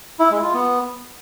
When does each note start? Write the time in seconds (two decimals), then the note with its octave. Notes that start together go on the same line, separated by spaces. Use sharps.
0.19 E4
0.31 G#3
0.42 F4
0.54 B3